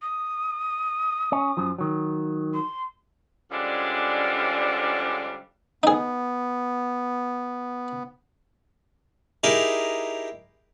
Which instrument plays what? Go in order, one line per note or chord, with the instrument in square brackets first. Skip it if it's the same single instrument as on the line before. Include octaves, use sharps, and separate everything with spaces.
[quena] D#6
[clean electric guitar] C#4
F#2 F3
D#3 F#3
[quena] C6
[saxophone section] D3 F3 G3 G#3 C#4 D4
[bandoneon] B3 [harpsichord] D#4 G#4
[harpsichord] D#4 E4 G4 G#4 A#4 F5